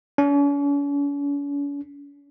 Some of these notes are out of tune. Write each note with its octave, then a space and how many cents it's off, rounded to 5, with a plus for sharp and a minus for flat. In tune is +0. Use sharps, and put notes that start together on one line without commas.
C#4 +45